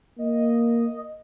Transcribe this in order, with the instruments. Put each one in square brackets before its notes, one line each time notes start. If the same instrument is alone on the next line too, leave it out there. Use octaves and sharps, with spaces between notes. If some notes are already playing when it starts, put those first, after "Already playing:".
[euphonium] A#3 [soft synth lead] D#5